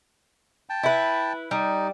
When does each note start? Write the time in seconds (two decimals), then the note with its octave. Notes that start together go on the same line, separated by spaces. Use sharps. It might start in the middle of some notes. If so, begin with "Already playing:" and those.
0.70 G5 A5
0.83 E4 B4
1.51 G3 D#4